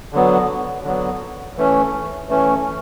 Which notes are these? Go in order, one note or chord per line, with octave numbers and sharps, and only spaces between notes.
D3 F#3 B3
D3 F#3 B3
E3 A3 C#4
E3 A3 C#4